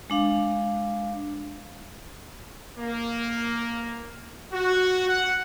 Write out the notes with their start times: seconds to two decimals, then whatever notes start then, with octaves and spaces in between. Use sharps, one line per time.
0.10 G#3 D4 F5
2.78 A#3
4.53 F#4
5.08 F#5